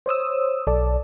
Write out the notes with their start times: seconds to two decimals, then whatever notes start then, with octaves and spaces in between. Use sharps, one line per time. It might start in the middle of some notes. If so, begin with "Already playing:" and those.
0.06 C5 C#5 D#6 E6
0.67 B1 A4 D5